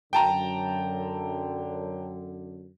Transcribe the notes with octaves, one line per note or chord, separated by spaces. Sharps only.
F#2 D3 G5 A5 A#5